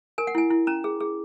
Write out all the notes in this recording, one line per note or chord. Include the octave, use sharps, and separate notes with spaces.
A#4 G#5
F#5
E4 G#5
E4
C#4 A#5
G#4
G#4